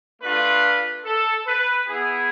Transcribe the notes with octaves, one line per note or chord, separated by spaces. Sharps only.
A3 D4 F4 B4
A4
B4
B3 E4 G#4